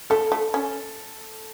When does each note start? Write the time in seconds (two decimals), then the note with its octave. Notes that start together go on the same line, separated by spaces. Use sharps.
0.10 A3 A4
0.32 A3
0.54 C#4